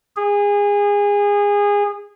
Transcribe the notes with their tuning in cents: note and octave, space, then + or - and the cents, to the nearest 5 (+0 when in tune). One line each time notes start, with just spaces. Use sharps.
G#4 -25